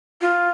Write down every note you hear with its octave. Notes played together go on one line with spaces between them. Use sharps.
F4